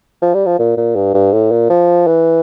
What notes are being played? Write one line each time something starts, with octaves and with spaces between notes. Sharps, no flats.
F3
G3
F3
A#2
A#2
G2
G2
A2
A#2
F3
E3